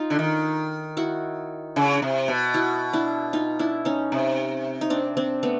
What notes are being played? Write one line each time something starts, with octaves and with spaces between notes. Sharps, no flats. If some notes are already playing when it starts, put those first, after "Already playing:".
Already playing: D#4 F4
D3
D#3
E4 F#4
C#3
C3
B2
E4 F#4
D4 E4
D#4 F4
D4 E4
C#4 D#4
C3
D#4
C4 D4
C4 D4
A3 B3